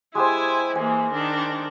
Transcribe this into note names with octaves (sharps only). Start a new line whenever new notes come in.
G#3 E4 G4 C5 G#5
E3 A#3 G#5
D#3 D4